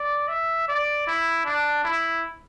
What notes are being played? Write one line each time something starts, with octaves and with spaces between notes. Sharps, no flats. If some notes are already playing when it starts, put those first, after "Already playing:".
Already playing: D5
E5
D5
E4
D4
E4